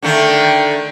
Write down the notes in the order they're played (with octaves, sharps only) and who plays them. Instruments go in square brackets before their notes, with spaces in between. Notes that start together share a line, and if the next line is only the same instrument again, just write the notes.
[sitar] D3 D#3 A3